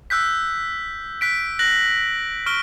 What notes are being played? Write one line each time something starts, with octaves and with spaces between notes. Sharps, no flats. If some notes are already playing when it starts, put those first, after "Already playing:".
E6 F#6 G6 B6
F#6 B6 D7
F#6 A#6 F#7
C#6 F6 D7 G7